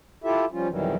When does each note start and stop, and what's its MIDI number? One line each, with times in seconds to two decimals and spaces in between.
0.24 0.45 64
0.24 0.45 65
0.24 0.45 67
0.24 0.45 69
0.24 0.45 76
0.52 0.69 53
0.52 0.69 55
0.52 0.69 61
0.52 0.69 65
0.69 0.96 41
0.69 0.96 47
0.69 0.96 51
0.69 0.96 52
0.69 0.96 54
0.69 0.96 55